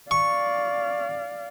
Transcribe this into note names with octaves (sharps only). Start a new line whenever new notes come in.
D5 F5 C#6